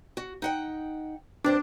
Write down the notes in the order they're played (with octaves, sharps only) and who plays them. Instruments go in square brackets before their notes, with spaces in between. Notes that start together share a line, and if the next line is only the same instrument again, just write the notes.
[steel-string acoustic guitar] F#4
D#4 F#5 G5
[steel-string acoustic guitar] G2 C4 C5 [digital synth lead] D4